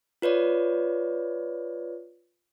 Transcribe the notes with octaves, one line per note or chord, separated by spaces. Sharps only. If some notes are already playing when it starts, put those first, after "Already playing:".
F4 B4 C#5 D5